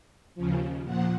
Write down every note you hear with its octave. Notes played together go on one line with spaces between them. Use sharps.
D#2 C#3 F3
A#2 F3 F#5